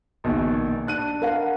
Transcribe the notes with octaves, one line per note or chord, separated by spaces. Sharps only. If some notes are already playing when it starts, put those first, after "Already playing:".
A#1 B2 D#3
D4 F#6 D#7
A#4 F5 F#5